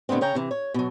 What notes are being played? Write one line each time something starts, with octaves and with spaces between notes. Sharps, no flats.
B2 D3 A3 B3 C4
C#3 C#5 G5 A#5
C3 E3
C#5
B2 F#3